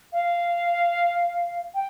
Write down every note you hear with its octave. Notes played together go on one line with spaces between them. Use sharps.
F5
G5